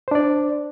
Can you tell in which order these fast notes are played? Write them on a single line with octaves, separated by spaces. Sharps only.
C5 D4 D5